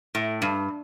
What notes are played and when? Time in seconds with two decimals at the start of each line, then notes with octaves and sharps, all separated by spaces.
0.15 A2
0.42 G2